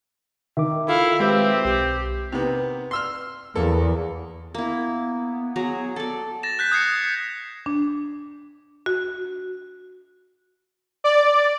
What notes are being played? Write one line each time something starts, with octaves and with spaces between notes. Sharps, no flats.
D#3 E5 D6
E4 F4 A4 F5
G#3 C4 G4 B4 E5
B1 G4
C3 D#3 B3
C6 E6 F6
E2 A#3 A4
A#3 B3 E4
F#3 G#4 A#5
A4 D5
A6 A#6 E7
F#6 G6 B6
D#6 G#6 C7 C#7
D4
F#4
D5